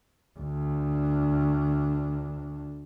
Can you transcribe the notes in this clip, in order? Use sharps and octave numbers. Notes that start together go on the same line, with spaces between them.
D2 D4